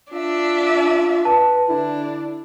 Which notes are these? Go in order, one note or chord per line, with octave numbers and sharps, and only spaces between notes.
D4 F4 E5
B4 A5
D3 D4 E4